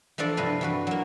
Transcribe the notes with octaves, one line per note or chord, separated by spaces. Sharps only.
E3 F3 D4 A4 D5
G2 C3 B4 F5
E3 F#4 B4
F#3 A#3